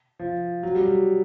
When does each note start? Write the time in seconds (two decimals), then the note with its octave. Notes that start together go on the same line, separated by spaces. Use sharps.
0.19 F3
0.63 F#3
0.75 G3
0.86 F#3